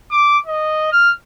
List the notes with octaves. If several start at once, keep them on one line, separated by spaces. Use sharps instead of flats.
D6
D#5
F6